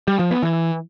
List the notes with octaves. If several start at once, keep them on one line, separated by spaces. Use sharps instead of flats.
G3
F3
B3
E3